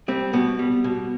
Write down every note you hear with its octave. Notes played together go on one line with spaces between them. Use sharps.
G3 C4
B2 B3
G3
B2